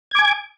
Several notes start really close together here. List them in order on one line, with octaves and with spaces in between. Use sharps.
G#6 D6 G#5